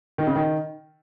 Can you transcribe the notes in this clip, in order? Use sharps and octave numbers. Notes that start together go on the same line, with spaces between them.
D#3
C#3
D#3